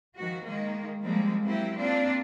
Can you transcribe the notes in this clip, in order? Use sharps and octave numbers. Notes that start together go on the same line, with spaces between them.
D#3 F3 F#4
D#3 G#3 A#3
F3 G3 G#3 A#3 C4
F#3 A#3 C4 E4 G4
A#3 C4 D4 F4 D5